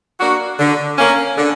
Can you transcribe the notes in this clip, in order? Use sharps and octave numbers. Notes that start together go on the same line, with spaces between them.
A#3 D4 F#4
D3
A#3 C#4
D3